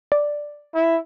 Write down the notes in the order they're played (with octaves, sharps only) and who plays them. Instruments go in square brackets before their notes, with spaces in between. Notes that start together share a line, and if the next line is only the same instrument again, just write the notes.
[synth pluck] D5
[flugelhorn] E4